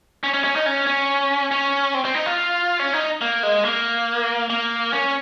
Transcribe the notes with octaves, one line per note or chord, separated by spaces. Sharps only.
C#4
C#4
C#4
D#4
C#4
C#4
C#4
C4
C4
D#4
F4
C#4
D#4
A#3
G#3
A#3
A#3
C#4